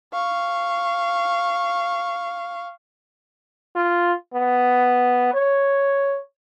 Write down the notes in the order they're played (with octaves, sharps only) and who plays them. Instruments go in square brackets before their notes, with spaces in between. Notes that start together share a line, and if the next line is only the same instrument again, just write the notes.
[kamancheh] F5 C#6
[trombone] F4
B3
C#5